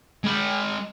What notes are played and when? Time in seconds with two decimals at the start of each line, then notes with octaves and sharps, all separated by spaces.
0.24 G#3 B5